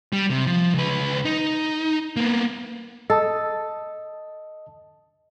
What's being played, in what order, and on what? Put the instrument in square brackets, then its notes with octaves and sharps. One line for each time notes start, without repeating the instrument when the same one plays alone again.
[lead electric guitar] G3
C3
F3
C#2 B4
D#4
A#3 B3
[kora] A4 [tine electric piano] D#5 A5 D#6